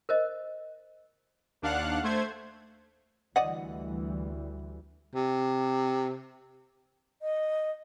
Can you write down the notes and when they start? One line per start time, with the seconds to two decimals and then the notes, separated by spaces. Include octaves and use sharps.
0.09 A#4 C5 D#5
1.62 D#2 D4 F5 F#5 F#6
2.03 A3 C5 G#6
3.36 D2 E3 G3 D5 D#5 F#5
5.15 C3
7.22 D#5